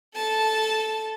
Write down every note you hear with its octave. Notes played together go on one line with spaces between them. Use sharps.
A4 A5